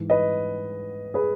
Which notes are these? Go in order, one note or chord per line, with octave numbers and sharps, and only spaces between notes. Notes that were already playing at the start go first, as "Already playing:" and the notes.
Already playing: G#2 E3
B4 D#5
G#4 B4